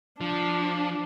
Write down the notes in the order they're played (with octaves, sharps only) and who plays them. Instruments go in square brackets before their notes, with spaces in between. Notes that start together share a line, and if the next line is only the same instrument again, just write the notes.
[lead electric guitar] F3 [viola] D4